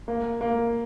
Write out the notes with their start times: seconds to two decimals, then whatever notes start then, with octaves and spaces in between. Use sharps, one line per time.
0.08 A#3
0.41 A#3